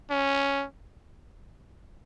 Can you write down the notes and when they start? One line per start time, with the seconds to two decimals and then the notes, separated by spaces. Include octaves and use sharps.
0.10 C#4